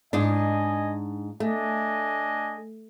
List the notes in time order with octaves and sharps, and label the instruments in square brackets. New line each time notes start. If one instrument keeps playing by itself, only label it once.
[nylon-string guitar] G#2 D4 [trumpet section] D#5 G#5
[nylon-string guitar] A3 [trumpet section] D4 D#5 G#5